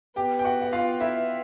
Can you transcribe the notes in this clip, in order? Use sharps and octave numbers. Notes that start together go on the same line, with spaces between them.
B3 G4 G5
G5
F#4 F#5
F#5
F4 F5
E4 E5